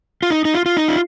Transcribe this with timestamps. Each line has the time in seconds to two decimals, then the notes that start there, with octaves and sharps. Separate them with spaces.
0.23 F4
0.30 D#4
0.45 D#4
0.54 F4
0.66 F4
0.77 D#4
0.88 F4